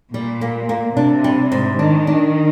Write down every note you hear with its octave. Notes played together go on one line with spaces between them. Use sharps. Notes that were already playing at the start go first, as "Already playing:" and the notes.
A#2 G3
A#3
A#3
C3 D4
G3
G#2
D#3 D4
D4